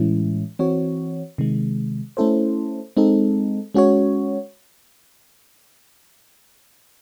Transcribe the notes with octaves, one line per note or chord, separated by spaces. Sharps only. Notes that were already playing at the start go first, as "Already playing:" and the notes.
Already playing: A2 E3 G#3 C#4 E4
E3 C4 F#4 C#5
C3 D#3 G#3
A3 C#4 E4 A4 C5
G#3 C4 D#4 A4
G#3 C#4 F#4 C#5